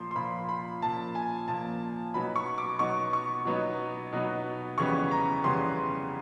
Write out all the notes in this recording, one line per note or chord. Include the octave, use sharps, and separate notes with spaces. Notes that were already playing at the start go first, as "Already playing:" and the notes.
Already playing: A#2 F3 A#3 C6
C6
A#2 F3 A#3 B5
B5
A#2 F3 A#3 A5
G#5
A#2 F3 A#3 A5
B2 F#3 B3 D#4 B5
C#6
D6
B2 F#3 B3 D#4 C#6
C#6
B2 F#3 B3 D#4
B2 F#3 B3 D#4
F2 C#3 E3 G3 B3 C#6
A#5
F2 C#3 E3 G3 B3 C6